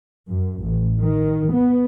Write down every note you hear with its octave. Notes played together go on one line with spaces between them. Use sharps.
F#2
A1
D#3
B3